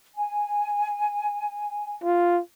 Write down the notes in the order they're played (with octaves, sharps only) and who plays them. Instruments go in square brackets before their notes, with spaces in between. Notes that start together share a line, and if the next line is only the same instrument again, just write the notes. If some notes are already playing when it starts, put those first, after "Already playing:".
[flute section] G#5
[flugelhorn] F4